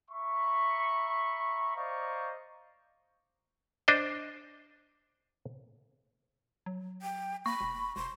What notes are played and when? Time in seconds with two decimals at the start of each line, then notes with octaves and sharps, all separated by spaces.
0.10 E5 A#5 B5 C#6
1.76 C5 D5 D#5 F5 A#5 C#6
3.88 D4 C5 D#5
6.66 F#3
7.02 G5
7.46 A#3 B5 C#6
7.61 E1
7.96 E1 C6